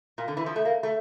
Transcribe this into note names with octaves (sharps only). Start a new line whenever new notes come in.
A#2
D3
E3
F3
A3
A#3
A3